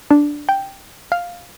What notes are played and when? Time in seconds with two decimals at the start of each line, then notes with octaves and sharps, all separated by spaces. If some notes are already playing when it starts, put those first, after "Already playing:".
0.11 D4
0.49 G5
1.12 F5